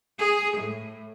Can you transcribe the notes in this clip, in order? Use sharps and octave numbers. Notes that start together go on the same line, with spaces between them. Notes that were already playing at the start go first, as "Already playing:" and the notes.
G#4
A2